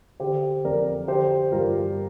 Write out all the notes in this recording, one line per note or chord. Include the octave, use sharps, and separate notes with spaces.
D3 G4 C5
F2 A#4 D5
D3 G4 C5
G2 F4 A#4